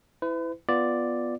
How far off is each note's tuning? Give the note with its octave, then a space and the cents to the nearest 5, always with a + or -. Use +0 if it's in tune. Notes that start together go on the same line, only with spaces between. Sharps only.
E4 +0 B4 +40
B3 +0 F4 +0 D5 +0